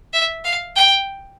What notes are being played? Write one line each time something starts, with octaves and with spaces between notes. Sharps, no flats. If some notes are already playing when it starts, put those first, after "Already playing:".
E5
F5
G5